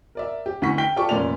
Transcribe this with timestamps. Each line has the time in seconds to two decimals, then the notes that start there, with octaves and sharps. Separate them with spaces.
0.15 A#4 D5 E5
0.46 G4
0.62 D2 E3 F#5 C#6 B6
0.78 G5 B6 G7
0.96 F4 G4 A4 D5 G5 C#6
1.09 F1 A#2 A#3 C#4 D5 F7